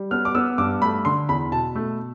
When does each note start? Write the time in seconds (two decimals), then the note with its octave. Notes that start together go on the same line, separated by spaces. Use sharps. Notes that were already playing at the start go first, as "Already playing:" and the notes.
Already playing: G3
0.11 B3 F6
0.25 D6
0.35 B3 E6
0.58 G2 D6
0.82 A3 B5
1.05 D3 C6
1.29 E2 B5
1.52 B2 A5
1.75 A3